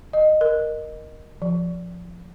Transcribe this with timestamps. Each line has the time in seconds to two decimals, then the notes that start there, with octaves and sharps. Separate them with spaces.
0.13 D#5
0.41 A#4
1.42 F3